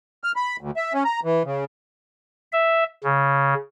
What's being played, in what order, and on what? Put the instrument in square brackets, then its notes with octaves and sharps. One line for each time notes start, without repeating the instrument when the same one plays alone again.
[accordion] F6
B5
D2
E5
C#4
A#5
E3
C#3
[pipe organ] E5
C#3